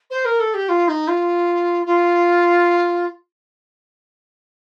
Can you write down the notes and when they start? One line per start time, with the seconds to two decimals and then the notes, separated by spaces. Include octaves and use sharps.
0.10 C5
0.25 A#4
0.40 A4
0.54 G4
0.69 F4
0.88 D#4
1.08 F4
1.86 F4